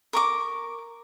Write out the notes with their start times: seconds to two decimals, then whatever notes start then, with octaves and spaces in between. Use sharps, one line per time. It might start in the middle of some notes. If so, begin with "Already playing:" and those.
0.13 A#4 C#6 D6